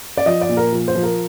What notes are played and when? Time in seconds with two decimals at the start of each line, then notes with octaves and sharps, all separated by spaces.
0.17 D5
0.26 F3 D#5
0.41 D5
0.49 A#2
0.57 A#4
0.72 F3
0.88 C5
0.95 F3
1.03 A#4